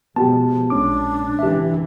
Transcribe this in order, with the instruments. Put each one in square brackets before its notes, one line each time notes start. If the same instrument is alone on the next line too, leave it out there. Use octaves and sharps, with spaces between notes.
[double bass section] B2 F3 G#3 [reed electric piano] B3 F#4 G4 [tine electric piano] A5
[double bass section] A#1 [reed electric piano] G#3 C#4 D6 [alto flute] D4
[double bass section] G#1 C3 E3 [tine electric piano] G4 E5